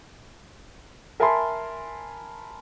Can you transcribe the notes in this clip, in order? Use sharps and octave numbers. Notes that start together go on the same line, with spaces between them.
A#4 E5 G#5 A5 B5 C6